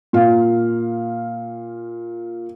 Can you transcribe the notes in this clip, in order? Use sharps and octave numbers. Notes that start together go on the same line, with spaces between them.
A#2 F5